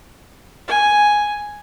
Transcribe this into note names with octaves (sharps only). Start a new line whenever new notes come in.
G#5